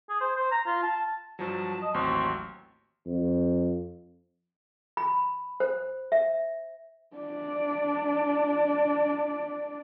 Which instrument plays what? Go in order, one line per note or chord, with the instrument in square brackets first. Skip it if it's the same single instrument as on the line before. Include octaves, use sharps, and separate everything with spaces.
[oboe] G#4
C5
C5
A#5
F4
A5
[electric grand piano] G2 F3 F#3 [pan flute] A5
[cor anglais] D#5
[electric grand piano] A1 D#2 F#3 [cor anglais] C4 [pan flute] C#6
[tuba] F2
[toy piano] B5
C5
E5
[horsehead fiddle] D4 D5